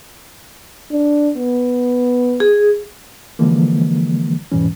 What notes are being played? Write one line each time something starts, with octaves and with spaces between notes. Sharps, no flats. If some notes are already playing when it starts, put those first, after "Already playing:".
D4
B3
G#4
D3 E3 F3 G3 G#3 A#3
E2 G#2 B2 E3 G3 C#4